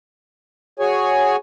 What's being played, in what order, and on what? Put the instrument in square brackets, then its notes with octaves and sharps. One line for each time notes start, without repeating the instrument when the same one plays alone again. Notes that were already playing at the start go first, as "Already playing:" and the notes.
[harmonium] F#4 G#4 C#5 G#5